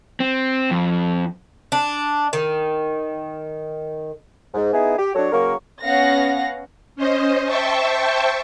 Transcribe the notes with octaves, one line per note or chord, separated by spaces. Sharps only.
C4
F2
D4
D#3
G#2
B3 D#4 E4 G#4
G4
F#3 D4 A4 C#5
C#3 F#3 A#3 A#4 C#6
B3 C#4 F5 F#5 A#6
C#4 C5 D#5
C5 E5 G5 A5 C#6